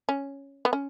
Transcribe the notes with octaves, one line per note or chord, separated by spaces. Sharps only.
C#4
B3
C#4